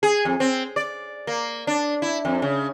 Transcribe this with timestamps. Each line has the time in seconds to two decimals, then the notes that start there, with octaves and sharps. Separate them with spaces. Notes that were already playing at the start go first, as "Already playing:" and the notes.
0.03 G#4
0.25 F2
0.40 C4
0.76 D5
1.27 A#3
1.67 D4
2.02 E4
2.25 F2
2.42 C#3